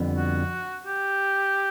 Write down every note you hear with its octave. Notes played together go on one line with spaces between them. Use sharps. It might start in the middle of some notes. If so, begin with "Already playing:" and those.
Already playing: F2 D3 G3 B3
F#4
G4